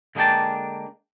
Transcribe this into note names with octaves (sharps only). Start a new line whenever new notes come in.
D3 G#3 A#3 D4 G5 A5